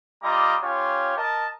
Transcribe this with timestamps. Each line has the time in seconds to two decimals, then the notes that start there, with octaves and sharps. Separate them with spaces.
0.23 G3 F4 D#5 A#5 D6
0.62 C#4 F4 G4 C#5
1.17 A#4 D#5 A5